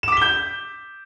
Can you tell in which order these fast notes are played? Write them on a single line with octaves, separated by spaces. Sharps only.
E7 D6 B6 G7 G6